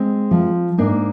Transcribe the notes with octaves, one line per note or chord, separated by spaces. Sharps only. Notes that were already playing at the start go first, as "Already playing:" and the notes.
Already playing: G#3 C4
F3
G#2 A#3 D4